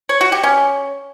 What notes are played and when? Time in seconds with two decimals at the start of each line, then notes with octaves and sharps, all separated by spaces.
0.09 C#5
0.21 F#4
0.32 G4
0.43 C#4